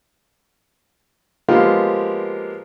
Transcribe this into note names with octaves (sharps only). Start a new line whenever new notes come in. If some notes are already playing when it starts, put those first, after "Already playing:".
F3 G#3 A#3 B3 F4 G4